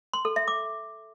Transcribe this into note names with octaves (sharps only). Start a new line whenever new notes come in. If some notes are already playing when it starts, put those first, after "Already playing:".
C6
A4
E5
D6